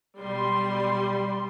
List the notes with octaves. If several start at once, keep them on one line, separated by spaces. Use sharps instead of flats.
B1 G3 C6